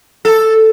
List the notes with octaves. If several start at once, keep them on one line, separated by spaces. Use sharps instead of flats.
A4